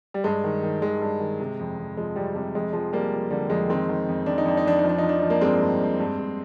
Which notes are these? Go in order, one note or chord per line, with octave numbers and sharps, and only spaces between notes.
G3
G2 G#3
D#3
D#3
D#3 G#3
G2
D#3
C3
F2
F2
F3 G#3
F2 G3
C3 G3
F2 G#3
F3 G#3
F3 G3 A#3
F3
D3 G3
F2 G#3
D#3 G#3 C4
D#3
F2
F2 D4
D#4
F2 D4
D#4
F2 D4
F3 D#4
D4
F3 D#4
D4
F3 D#4
A#3 D4
G2 G#3 C4
G2
G2
G2
G2